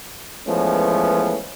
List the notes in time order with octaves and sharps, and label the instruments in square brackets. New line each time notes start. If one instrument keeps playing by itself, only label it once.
[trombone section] E3 F3 G#3 A3 B3 C#4